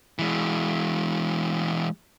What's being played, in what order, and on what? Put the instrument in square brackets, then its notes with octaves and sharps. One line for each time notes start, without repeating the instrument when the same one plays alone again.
[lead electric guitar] E3 G#3